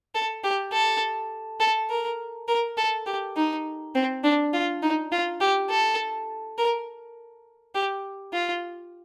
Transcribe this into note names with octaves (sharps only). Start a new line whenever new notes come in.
A4
G4
A4
A4
A#4
A#4
A4
G4
D#4
C4
D4
F4
D#4
F4
G4
A4
A#4
G4
F4